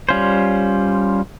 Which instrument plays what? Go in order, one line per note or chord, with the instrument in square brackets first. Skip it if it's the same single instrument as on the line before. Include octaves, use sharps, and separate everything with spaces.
[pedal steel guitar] G3 C#4 F4 C5